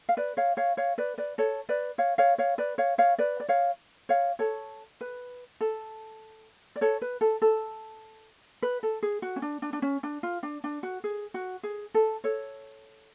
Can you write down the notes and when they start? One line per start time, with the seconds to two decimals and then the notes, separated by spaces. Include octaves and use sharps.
0.09 F5
0.17 B4 D5
0.37 C#5 F5
0.57 C#5 F5
0.77 C#5 F5
0.98 B4 D5
1.18 B4 D5
1.38 A4 C#5
1.69 B4 D5
1.98 C#5 F5
2.18 C#5 F5
2.38 C#5 F5
2.58 B4 D5
2.78 C#5 F5
2.98 C#5 F5
3.18 B4 D5
3.40 D5
3.49 C#5 F5
4.09 C#5 F5
4.39 A4 C#5
5.01 B4
5.61 A4
6.76 D5
6.81 A4 C#5
7.02 B4
7.21 A4
7.42 A4
8.62 B4
8.83 A4
9.03 G#4
9.22 F#4
9.36 C#4
9.42 D4
9.62 D4
9.73 D4
9.82 C#4
10.03 D4
10.23 F4
10.43 D4
10.64 D4
10.83 F#4
11.04 G#4
11.34 F#4
11.63 G#4
11.94 A4
12.24 A4 C#5